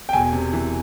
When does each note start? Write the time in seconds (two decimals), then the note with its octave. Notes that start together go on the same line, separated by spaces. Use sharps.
0.09 G5
0.13 E1 G#5
0.33 C3
0.53 E3